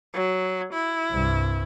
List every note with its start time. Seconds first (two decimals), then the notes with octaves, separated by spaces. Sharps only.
0.14 F#3
0.73 E4
1.11 C2 G2